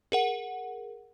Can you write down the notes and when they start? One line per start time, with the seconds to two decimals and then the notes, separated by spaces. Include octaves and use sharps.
0.12 G#4 A#4 F#5